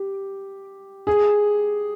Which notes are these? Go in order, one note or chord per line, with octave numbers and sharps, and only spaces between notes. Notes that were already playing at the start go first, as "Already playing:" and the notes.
Already playing: G4
G#4